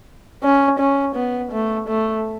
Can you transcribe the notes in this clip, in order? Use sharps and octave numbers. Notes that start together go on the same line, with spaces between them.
C#4
C#4
B3
A3
A3